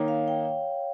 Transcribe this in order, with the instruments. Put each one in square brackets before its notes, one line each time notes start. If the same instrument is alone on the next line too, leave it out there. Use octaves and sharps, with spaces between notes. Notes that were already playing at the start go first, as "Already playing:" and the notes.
Already playing: [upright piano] D#3 A#3 D#4 [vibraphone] C#5
[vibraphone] F5
G5